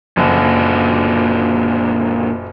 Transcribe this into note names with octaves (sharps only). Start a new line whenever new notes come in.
F#1 A#2 D3 F#4